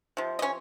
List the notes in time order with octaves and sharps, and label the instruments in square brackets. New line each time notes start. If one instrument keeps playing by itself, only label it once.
[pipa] C3 F3
D#5
C#4 C#5